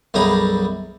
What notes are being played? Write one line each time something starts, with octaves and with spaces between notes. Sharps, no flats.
B1 F#2 G3 G#4 A#5 B5